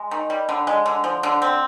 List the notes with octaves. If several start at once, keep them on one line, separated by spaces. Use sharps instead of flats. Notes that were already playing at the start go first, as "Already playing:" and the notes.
Already playing: G#3
D#3
G3
D3
G#3
D3
F3
D3
C4